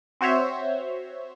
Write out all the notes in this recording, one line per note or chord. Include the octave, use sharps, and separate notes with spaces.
C4 F#4 C5 C#5 E5